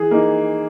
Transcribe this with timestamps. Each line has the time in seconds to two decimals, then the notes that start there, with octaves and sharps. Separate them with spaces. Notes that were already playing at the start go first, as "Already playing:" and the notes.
Already playing: E3 G#4
0.11 A#3 D#4